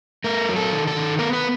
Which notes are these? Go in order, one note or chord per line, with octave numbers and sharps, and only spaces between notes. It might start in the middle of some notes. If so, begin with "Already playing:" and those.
A3 A#4
F#3
A4
D#3
A4
D#3
B3 A#4
B4